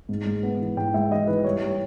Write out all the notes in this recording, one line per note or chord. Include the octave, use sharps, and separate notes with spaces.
G#2
G#3
B3
E3
G#2 G5
G#3 E5
E3 D#5
E3 B4
G3 C#5
G3